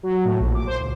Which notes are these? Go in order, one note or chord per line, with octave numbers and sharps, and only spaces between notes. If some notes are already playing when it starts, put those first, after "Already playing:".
F#3
A2
A#1
D6
C5
C#2